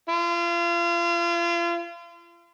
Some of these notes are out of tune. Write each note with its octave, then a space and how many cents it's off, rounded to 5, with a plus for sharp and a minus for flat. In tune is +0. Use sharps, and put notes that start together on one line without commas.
F4 -35